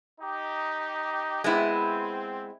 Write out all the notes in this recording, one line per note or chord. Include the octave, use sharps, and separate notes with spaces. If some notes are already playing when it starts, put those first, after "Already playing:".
D#4 G4
G#3 B3 C4 E4